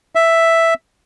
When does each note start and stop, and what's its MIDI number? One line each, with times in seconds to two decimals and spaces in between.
0.15 0.74 76